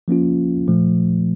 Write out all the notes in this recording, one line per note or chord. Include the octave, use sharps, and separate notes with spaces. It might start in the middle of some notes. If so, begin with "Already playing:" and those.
F3 A#3 C#4 F4
A#2 F3 A3